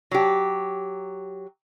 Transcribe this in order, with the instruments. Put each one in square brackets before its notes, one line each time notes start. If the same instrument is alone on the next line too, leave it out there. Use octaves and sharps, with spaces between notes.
[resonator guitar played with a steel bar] F#3 G4